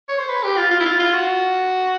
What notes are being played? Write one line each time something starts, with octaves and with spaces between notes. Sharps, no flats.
C#5
C5
B4
G4
F4
F4
E4
F4
F4
F#4